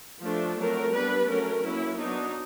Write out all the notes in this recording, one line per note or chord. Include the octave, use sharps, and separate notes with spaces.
F3 A3 D4
F#3 A3 C4 A#4
G3 B3 D4 B4
F#3 A3 C#4 A#4
F#3 A#3 C#4 E4
F#3 B3 D4 D#4